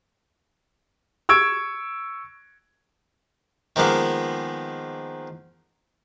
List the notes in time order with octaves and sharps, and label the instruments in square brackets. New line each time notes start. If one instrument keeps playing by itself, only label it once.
[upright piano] C#6 E6 G#6 D7
[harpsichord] D#3 F3 G#3 A#3 B3